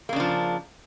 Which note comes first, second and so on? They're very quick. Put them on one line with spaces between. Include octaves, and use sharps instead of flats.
A#3 C#3 D4 F3